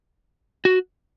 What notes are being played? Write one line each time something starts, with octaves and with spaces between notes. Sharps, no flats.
F#4